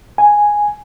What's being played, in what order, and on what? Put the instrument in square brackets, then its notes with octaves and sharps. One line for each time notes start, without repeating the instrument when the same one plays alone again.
[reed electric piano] G#5